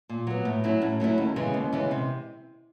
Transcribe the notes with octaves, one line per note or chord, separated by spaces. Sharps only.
A#2
F#3 B3
A2
F#3 A3 C#4 E4
A2
F#3 A3 C#4 E4
D#2
C#3 E3 G#3 B3
D#2
C#3 E3 G#3 B3
C3